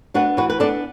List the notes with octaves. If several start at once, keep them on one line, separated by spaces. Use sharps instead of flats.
B3 D4 F#4 B4
E3 F#4 B4
B4
B3 D4 A4 D5